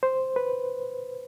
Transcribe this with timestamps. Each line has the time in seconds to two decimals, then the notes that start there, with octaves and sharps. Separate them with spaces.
0.03 C5
0.36 B4